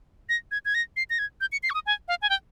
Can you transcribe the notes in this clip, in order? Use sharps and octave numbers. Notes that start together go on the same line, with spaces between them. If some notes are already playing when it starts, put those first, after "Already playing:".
A#6
G#6
G#6
A#6
C7
A#6
G#6
G6
C#7
C7
C#6
D#6
G#5
F5
G#5
G5